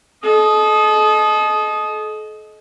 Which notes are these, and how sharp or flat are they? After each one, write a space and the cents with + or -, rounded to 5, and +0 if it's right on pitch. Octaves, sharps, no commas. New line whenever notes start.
A4 -40 D#5 +0